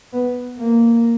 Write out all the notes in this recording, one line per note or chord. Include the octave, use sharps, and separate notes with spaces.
B3
A#3